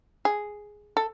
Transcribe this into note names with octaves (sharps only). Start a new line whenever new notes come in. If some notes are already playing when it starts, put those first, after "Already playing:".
G#4
A4